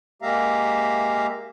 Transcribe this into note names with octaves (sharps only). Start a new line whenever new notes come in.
G#3 A#3 G4 E5 F5 A#5